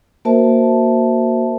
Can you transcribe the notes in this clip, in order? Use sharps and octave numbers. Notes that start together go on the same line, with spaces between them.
A#3 F#4 A#4 C5 E5 A5